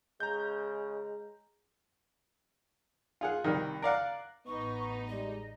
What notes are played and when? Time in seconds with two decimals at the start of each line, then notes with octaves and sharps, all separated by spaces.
0.20 C#3 G#3 A#5 G6
3.21 F4 G#4 F#5
3.44 C2 D#3
3.82 A#4 D5 F5 F#5
4.47 A1 B3 D#4 C#6
5.08 G3 G#3 D#5